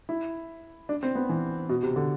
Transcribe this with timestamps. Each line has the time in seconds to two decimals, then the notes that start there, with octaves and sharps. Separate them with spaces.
0.09 E4
0.89 D4
1.03 C4
1.15 B3
1.29 E3
1.69 B2
1.83 C3
1.96 D3